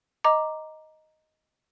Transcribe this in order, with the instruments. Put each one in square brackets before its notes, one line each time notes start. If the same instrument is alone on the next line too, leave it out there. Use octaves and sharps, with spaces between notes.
[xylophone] D#5 A#5 D6